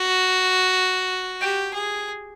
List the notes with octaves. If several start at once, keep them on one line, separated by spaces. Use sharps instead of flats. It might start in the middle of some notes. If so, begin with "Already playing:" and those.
Already playing: F#4
G4
G#4